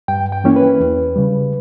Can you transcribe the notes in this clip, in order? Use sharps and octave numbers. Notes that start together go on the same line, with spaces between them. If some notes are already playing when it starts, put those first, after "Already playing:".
G2 G5
G5
E3 A#3 C#4 E4
B4
E2
C#3 G3